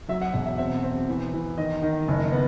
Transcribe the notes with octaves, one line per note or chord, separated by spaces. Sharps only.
F#3 E5
F#5
E1 F#5
E5
C4 E5
C4
E3
E3
D#3 D#5
D#3
F#1
B3